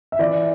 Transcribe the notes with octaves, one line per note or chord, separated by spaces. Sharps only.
E5
E3 D5